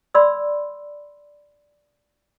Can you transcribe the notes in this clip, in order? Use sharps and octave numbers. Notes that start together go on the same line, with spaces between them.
D5 B5 C6 E6